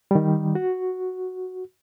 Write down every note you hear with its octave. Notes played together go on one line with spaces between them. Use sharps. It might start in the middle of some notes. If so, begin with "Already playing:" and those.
D#3 G3
F#4